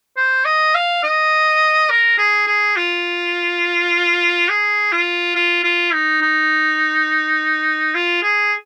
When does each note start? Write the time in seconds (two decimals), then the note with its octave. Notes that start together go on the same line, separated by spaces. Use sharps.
0.17 C5
0.45 D#5
0.75 F5
1.03 D#5
1.90 A#4
2.18 G#4
2.47 G#4
2.77 F4
4.49 G#4
4.92 F4
5.35 F4
5.64 F4
5.93 D#4
6.22 D#4
7.95 F4
8.23 G#4